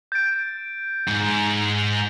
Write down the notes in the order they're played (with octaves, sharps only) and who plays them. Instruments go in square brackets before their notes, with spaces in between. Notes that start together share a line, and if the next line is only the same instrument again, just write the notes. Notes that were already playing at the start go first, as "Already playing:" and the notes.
[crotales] G6 A6 D7
[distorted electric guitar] G#2